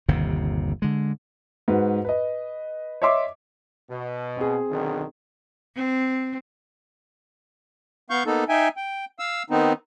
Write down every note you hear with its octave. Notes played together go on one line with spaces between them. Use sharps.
G1 D#2 C3
D3 G#3
G#2 F#4 B4
B4 D#5
C#5 D#5 E5 C6 D6
B2
C4 G#4
B1 D3 D#3
C4
B3 F5 C#6 G6
A#3 B3 D#4 A4
D#4 E5 G5 G#5
G5
F5 E6
D#3 B3 C4 D#4